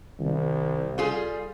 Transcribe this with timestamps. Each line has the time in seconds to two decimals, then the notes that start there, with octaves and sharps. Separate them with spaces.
0.20 C2 D#3 C4
0.98 G3 F4 G#4 A4 F5